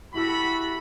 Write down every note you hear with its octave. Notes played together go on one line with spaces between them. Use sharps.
E4 F#4 G4 A4 B5 E6